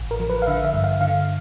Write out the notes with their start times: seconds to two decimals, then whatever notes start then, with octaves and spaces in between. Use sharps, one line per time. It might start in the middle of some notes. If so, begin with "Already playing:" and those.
Already playing: A1
0.11 A#4
0.20 F3
0.30 B4
0.42 F5
0.47 D3 E5
0.65 E5
0.74 G2
0.84 F5
1.01 D3 F5